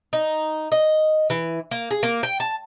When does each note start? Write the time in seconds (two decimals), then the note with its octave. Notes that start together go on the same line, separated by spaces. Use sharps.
0.13 D#4
0.72 D#5
1.30 E3
1.71 A#3
1.91 G#4
2.03 A#3
2.23 G5
2.40 A5